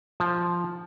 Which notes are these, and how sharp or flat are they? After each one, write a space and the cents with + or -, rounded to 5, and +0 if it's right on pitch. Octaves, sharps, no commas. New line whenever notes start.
F3 +0 A5 -20